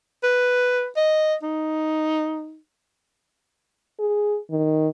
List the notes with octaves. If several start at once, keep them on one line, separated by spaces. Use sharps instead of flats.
B4
D#5
D#4
G#4
D#3